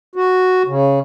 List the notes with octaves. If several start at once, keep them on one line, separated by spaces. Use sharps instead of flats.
F#4
C#3